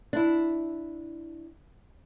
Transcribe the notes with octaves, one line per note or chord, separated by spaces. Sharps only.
D4 E4